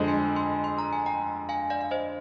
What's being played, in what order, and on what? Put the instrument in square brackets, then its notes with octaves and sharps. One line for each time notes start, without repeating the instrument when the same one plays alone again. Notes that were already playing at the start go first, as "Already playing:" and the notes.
Already playing: [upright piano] F2 D3 G#3
[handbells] G#5 C6
G#5 C6
C6
A#5
G#5
G5 A#5
F5 G#5
D5 F5
F5
C5 D#5